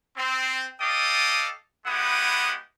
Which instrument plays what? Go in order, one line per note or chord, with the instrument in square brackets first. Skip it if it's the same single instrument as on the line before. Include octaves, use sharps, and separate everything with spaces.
[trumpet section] C4
A4 D5 D#5 F5 G5 D#6
G#3 B3 E4 G4 F#5 D#6